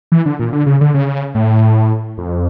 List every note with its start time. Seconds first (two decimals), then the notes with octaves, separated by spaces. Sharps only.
0.12 E3
0.26 D3
0.39 A#2
0.53 D3
0.66 C#3
0.81 D3
0.94 C#3
1.35 A2
2.18 F2